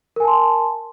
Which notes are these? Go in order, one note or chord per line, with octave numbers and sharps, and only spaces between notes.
A#4 G#5 A5 C6